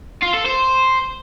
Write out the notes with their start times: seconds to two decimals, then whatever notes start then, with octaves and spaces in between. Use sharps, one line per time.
0.22 F4
0.34 A4
0.45 C5